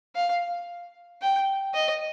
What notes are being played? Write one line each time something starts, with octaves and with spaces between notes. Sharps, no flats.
F5
G5
D#5